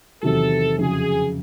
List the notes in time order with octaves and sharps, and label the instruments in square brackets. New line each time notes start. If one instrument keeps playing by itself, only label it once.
[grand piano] E2 C3 D#3 F#3 [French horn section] A4
[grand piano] F2 C#3 F#3 [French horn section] G#4